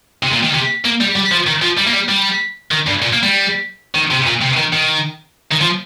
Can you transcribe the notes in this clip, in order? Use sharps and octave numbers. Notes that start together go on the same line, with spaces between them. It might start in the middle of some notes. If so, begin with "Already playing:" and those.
C3
A#2
D#3
C3
A#3
G3
G3
F3
D#3
F3
G3
A#3
G3
G3
D#3
G2
A#2
A#3
G3
D#3
C3
A#2
C3
D#3
D#3
D#3
F3